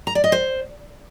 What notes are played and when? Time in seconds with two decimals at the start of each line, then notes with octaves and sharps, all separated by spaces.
0.07 A#5
0.15 D5
0.24 D#5
0.32 C5